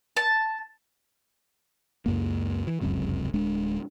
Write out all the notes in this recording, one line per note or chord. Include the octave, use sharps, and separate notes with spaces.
A5
C#2 F#2 A#3
E3
F1 C#2 F#2 C3
D1 G#3 D4